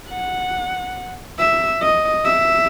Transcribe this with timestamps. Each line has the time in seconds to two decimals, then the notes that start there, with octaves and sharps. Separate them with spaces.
0.10 F#5
1.39 E5
1.82 D#5
2.25 E5